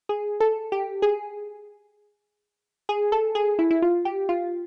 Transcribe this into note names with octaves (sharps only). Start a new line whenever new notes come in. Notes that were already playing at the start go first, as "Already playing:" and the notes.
G#4
A4
G4
G#4
G#4
A4
G#4
E4
E4
F4
G4
F4